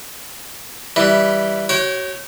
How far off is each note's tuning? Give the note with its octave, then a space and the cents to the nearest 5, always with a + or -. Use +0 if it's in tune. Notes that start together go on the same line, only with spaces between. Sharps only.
E3 +0 G3 +0
F#4 +30 C#5 -10 G5 -25